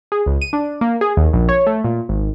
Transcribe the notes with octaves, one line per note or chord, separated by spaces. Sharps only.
G#4
C#2
D#7
D4
A#3
G#4
D#2
A#1
C#5
A3
A#2
G#1